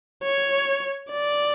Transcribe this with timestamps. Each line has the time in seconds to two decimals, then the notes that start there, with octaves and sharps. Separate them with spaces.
0.23 C#5
1.11 D5